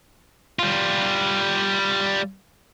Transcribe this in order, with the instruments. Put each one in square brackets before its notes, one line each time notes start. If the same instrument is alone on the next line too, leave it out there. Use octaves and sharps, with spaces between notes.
[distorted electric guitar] G3 F4